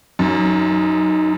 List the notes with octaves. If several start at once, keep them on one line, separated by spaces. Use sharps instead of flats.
F#2 D#4